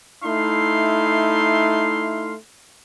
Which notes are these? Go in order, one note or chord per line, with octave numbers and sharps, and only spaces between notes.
A3 D#4 E4 F5 C6